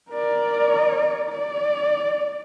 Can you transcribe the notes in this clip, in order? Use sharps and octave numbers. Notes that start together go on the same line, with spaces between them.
A#4 D5
D5